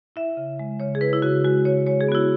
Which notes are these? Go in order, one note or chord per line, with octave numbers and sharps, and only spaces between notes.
E4 E5
C#3
G#3
C#3 C#5
G#4
E4 B4
E4
C#3 F#4
G#3 F#4
C#3 C#5
G#3 C#5
G#4
B3 F#4
E4